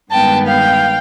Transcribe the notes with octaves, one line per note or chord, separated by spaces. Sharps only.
G2 D#3 G#3 B3 G5 A5
F5 G5